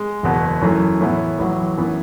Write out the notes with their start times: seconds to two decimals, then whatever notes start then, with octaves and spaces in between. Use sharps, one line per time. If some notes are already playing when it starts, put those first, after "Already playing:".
Already playing: G#3
0.23 F#1 E2 B2 F#3 B3
0.61 F#2 E3 A3
1.01 A2 E3 B3
1.38 A1 A2 F#3
1.77 F#2 E3 B3 E4